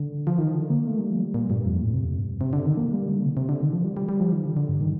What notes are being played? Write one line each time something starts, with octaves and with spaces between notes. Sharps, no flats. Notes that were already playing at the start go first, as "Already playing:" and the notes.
Already playing: D3
F3
D#3
D3
A#3
A3
G3
F3
G3
A#2
G2
F2
A2
C3
F2
G2
C3
D3
D#3
A#3
G3
D3
C3
C3
D3
D#3
F3
G3
G3
G3
F3
D#3
D3
D3
G2
D#3